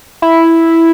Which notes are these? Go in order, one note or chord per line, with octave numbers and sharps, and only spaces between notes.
E4